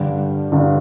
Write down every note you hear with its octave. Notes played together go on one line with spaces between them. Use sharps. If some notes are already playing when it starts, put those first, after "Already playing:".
Already playing: G2 D3 G3 D4
G2 D3 G3 D4